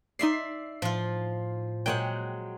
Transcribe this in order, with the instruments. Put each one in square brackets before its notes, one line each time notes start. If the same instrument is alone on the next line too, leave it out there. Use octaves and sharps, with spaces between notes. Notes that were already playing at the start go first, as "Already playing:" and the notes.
[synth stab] D#4 C7 [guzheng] D5 E5 C6
[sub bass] A2 [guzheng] F3 F4
[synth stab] A#2 G5 [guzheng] F#3 G#3 F#5